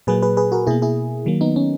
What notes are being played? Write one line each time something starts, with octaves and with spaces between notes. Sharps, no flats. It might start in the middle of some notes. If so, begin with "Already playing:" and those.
A#2 F#3 A#3 G#4 B4
G#4 B4
G#4 B4
F#4 A#4
B2 A#3 E4 G#4
E4 G#4
D#3 F#3 A#3
B3 D#4
C#4